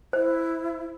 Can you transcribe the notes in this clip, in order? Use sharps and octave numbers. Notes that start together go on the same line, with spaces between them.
E4 C5